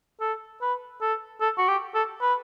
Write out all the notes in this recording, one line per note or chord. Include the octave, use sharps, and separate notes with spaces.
A4
B4
A4
A4
F#4
G4
A4
B4